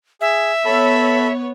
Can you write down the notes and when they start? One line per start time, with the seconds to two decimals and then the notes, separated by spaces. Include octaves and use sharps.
0.21 G#4 E5
0.65 B3 A4 C#5 B5